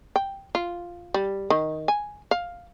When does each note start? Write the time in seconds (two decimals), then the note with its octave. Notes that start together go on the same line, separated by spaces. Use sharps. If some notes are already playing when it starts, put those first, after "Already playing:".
0.16 G5
0.55 F4
1.14 G3
1.50 D#3
1.88 G#5
2.31 F5